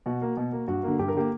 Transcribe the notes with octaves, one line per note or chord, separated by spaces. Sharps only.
B2 F#4
A#3
B2
A#3
G2 F#4
D3 A#3
G2 G4
A#4
D3 A#3 G4